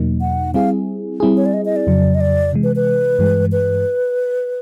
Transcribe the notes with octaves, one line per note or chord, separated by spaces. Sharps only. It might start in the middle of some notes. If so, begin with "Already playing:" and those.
Already playing: E2 B2 F#3 A#3 D#4
F#5
G3 C4 E4 G#4 F5
G3 C4 E4 G#4
C#5
D5
D#5
D#5
D5
F2 C#3 F#3
D#5
D5
C3 E3 G#3
B4
B4
G2 E3 G#3
B4